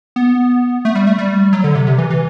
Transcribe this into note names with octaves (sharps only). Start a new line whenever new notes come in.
B3
A3
G3
A3
G3
F#3
D3
C3
C3
E3
E3